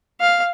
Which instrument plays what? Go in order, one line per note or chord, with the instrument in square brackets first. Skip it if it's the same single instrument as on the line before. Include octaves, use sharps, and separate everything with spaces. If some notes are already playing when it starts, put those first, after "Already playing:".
[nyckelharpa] F5